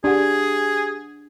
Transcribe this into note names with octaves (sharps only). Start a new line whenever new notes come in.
D4 G4 G#4 F#5